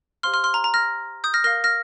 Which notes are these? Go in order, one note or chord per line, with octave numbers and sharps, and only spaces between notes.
G4 C5 F5 C6 F6
C6 F6
C6 F6
A#5
A#5
F6 A#6
D#6 G6
F6 A#6
A#4 F5 F6 A#6
F6 A#6